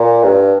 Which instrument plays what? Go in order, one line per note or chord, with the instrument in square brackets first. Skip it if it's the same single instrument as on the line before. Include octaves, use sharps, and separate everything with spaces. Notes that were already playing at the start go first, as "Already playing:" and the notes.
Already playing: [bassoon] A#2
G2